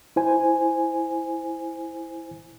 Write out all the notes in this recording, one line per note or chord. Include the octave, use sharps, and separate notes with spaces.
E4 C5 G#5